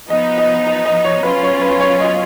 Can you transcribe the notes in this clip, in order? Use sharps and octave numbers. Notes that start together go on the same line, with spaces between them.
F3 B3 D#4 D#5
D#5
D#5
D#5
C#5
F#3 C#4 F4 B4
C#5
B4
C#5
D#5